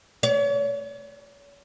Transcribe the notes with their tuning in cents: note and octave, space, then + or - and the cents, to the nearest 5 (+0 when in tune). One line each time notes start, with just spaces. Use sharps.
C#5 +40